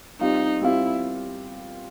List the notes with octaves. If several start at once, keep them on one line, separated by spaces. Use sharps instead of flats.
G3 C4 D#4 F4
G3 C4 E4 F4